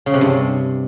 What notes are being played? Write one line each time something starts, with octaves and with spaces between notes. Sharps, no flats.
C#3
C3
G2